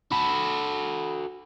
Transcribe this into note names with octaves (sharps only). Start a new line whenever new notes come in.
F#4 A4 B5